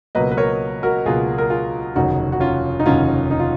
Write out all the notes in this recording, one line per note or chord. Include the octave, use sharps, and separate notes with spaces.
C#2 B2 F#3 A#3 B4 D#5
B4
A#4 C#5
F#4 A#4
C#2 B2 F#3 A#3 F4 G#4
A#4
F4 G#4
F1 D#2 C#3 F#3 D#4 F#4
F#4
C#4 F4
D#4
F1 D#2 C#3 F#3 C#4 F4
D#4
F4